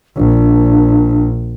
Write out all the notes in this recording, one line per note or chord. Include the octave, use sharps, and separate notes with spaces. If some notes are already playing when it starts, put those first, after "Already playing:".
A#1 D4